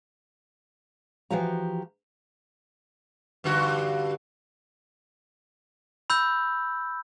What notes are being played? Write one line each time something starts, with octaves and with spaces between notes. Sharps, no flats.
E3 F3 F#4 G4 F5 A#5
G2 D3 F#4
B5 E6 G6